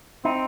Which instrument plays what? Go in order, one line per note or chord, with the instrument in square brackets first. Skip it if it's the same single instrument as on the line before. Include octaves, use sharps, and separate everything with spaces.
[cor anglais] C4 [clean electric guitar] D#4